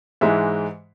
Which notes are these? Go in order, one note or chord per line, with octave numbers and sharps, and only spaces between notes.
G#2 E3 G#3 E5